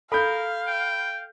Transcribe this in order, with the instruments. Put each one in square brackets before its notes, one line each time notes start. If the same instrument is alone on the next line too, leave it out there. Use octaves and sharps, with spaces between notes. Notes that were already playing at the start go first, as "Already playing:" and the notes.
[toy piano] A4 [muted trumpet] A#4 [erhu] F5 [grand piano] B5 G6
[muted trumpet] G5